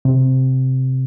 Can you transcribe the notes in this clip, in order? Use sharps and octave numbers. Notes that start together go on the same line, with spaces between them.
C3